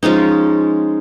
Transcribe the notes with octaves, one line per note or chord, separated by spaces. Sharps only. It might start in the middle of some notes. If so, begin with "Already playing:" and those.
F3 G#3 C#4 D#4